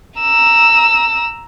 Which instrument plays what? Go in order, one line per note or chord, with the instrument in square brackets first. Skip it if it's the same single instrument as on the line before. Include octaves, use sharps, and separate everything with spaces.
[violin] A#5 E6